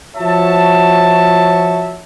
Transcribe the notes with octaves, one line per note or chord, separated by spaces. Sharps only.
F3 F#4 C#5 E5 A5